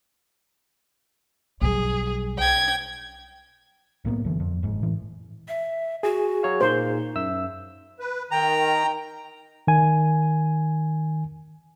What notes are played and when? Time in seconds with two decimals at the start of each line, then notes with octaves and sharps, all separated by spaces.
1.61 B1 G3 G#4
2.37 G5 G#6
4.05 B1 A2 A#3 B3
4.24 F#1 F#2 D3 E3
4.40 F2
4.63 F#1 G#2
4.83 G#1 A2 E3
5.48 E5
6.03 F#4 G#4
6.43 F#3 C#5 F5
6.61 A#2 A#3 D#4 C5
7.16 F#2 E5 E6
8.00 B4
8.31 D#3 G5 A#5
9.67 D#3 G#5